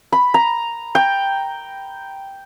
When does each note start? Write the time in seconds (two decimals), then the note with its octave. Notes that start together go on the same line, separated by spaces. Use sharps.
0.12 B5
0.34 A#5
0.95 G5